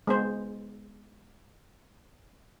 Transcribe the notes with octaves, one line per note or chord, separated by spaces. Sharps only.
G#3 B3 C5